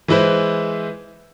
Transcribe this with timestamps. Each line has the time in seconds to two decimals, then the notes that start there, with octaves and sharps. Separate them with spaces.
0.08 E3 G#3 E4 B4 C5